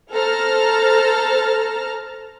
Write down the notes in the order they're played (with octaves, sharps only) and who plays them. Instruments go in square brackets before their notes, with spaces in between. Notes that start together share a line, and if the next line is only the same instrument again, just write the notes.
[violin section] A4 C5 A5 A#5 F6